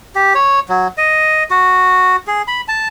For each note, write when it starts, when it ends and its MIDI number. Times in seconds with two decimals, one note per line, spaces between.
0.15 0.33 67
0.35 0.60 73
0.69 0.88 54
0.98 1.43 75
1.51 2.16 66
2.27 2.42 68
2.48 2.61 83
2.68 2.88 81